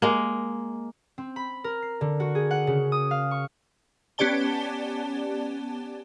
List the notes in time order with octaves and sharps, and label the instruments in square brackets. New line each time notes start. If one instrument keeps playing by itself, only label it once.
[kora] G#3 A#3
[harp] C4
B5
A#4
C7
D3
F#4
G#4
F#5
C#3
D#6
F5
C#6
[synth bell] B3 C#4 G4 D5 A5 G7